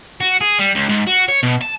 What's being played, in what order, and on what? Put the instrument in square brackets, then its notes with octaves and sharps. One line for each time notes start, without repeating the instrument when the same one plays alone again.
[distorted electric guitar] F#4
G#4
G3
C#2
G#2
F#4
C#5
B2
A5